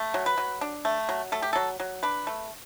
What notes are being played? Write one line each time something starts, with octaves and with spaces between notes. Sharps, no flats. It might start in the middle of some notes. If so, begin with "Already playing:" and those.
Already playing: A3
F#3
B4
F#3
D4
A3
F#3
A3 A4
G4
F#3 A4
F#3
D4 B4
A3